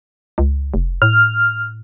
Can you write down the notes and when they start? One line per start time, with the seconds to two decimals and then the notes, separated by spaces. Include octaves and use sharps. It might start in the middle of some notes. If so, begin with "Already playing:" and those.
0.38 C#2
0.74 F1
1.02 A2 F6